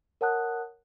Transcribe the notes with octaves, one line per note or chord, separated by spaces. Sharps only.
A#4 C#5 F#5 A5 D#6 F#6